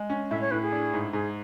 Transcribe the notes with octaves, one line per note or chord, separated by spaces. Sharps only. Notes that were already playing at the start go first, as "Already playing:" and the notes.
Already playing: G#3
C#4
A2 E5
C#5
A2 B4
G#4
D4
G#2
G#2 G#4